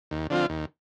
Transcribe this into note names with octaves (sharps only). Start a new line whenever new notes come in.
D#2
D3 F3 C4 F4
D#2